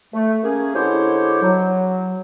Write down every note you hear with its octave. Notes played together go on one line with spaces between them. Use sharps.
A3
A#3 C#4 G#4
D3 G#3 E4 G4 C5 C#5
F#3